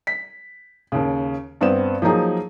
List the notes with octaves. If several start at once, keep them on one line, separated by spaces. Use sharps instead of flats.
B6
D#2 C#3
G2 B3 C4 E7
F3 F#3 A#3 D#4 G#4